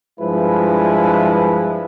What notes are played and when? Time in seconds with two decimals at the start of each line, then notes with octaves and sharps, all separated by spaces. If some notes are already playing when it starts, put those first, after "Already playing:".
0.20 G2 F3 G#3 E4 B4